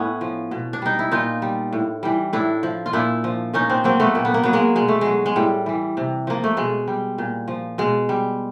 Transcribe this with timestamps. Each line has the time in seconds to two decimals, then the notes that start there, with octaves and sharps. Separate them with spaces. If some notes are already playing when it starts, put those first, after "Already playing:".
Already playing: A2 B3 C#4
0.21 F3
0.51 B2
0.73 D4
0.82 G3 D#4
0.99 E4
1.12 A#2 D#4 F4
1.42 G3
1.73 A2
2.03 E3 G3
2.33 A2 D4 E4
2.63 F3
2.86 F4
2.93 A#2 D4 E4
3.24 F3
3.53 A#2 C#4 D#4
3.70 C4 D4
3.84 F#3 A#3 C4
4.00 A3 B3
4.15 A#2 A#3
4.25 B3
4.34 A#3
4.43 F#3 B3
4.53 G#3 A#3
4.75 B2 G#3
4.88 A3
5.01 F#3 G#3
5.26 G#3
5.36 A2 G3
5.66 E3 G3
5.97 C3
6.27 F3 A#3
6.44 A3
6.57 B2 G#3
6.88 G3
7.18 A#2
7.48 F3
7.78 B2 G#3
8.09 G3